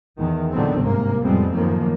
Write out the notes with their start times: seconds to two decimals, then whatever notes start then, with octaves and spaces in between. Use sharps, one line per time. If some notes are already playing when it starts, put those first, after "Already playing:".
0.18 E2 D#3
0.51 A#2 D3 D#3 F#3 B3 C4
0.80 G1 G#2 C3 A#3
1.21 F2 A2 G3 G#3 B3 C4
1.52 F#2 A2 D#3 F3 A#3